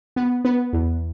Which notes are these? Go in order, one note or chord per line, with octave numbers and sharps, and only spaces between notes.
B3
B3
E2